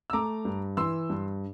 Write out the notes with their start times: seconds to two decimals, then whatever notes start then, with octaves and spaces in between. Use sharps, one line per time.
0.10 E6
0.13 A3 A#5 D6
0.45 G2
0.77 E3 C6 E6
1.10 G2